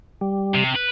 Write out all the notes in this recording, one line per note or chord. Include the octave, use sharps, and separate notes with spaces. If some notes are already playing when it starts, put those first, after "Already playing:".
G3
C3
B4